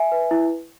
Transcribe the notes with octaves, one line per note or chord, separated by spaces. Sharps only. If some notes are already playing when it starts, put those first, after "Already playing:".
Already playing: E5 G#5
B4
E4